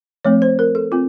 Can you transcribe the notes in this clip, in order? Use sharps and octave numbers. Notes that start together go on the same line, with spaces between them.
F3 A3 C4 C#5
C5
A#4
A4
C4 F4